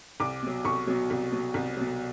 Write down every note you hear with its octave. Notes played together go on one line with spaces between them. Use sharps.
C2 D6
B2 F#3
C2 C#6
B2 F#3
C2
B2 F#3
C2
B2 F#3